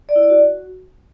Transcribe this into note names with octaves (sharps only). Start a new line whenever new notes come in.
D5
E4
D5
F#4